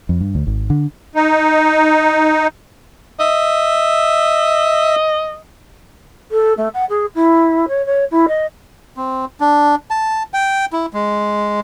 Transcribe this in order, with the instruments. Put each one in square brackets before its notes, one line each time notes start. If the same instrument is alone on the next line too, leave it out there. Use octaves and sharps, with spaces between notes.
[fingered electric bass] F2
G2
D2
G#1
D3
[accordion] D#4
[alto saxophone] D#5 [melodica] E5
[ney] A4
A3
F#5
G#4
E4
C#5
C#5
E4
D#5
[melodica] C4
D4
A5
G5
E4
G#3